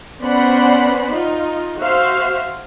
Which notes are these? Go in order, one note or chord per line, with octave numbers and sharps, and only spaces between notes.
B3 C#4 C5 D5 F#5 B5
D#4 F4
F#4 C5 E5 F5